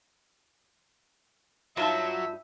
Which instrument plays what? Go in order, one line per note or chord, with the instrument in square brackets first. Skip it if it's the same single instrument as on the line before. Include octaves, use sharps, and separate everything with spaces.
[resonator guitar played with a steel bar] G2 D#4 A5 [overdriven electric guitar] F#3 [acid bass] F4 [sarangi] E5